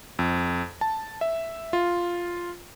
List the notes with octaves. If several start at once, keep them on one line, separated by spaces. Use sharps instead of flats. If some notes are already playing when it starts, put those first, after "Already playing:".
F2
A5
E5
F4